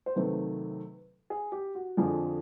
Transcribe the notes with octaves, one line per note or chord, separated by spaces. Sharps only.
C5
C3 D#3 F#3 A3 C4 B4
G#4
G4
F#4
F2 D3 F3 G#4